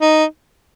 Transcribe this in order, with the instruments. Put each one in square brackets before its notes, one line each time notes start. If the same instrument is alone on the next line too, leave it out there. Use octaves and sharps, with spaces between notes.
[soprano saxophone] D#4